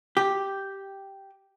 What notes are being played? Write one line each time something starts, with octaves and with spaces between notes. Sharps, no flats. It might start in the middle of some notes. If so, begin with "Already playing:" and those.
G4